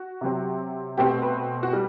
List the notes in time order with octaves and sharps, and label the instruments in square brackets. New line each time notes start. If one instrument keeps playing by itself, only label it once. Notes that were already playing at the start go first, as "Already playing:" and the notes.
Already playing: [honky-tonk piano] F#4
C3 F#3 C4
B2 A3 C4 G4
B4
F#4
G3